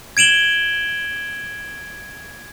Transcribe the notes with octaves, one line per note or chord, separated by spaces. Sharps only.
G#6 D7 E7 F#7 G7